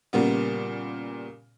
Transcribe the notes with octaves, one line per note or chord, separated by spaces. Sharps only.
A#2 C#3 G3 A#3 B3